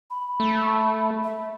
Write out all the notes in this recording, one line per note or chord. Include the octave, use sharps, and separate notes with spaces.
B5
A3
E5